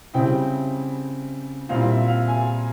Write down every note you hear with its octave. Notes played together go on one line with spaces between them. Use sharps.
C#3 G3 C4 E4 G5
A#2 G3 C4 E4 F5
E5
F5
G#5